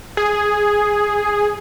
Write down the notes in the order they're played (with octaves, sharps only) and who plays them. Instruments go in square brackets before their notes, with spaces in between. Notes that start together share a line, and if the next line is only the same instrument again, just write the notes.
[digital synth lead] G#4